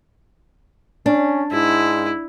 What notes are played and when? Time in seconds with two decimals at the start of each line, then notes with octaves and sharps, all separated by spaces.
1.06 C#4 D4
1.52 G#2 E4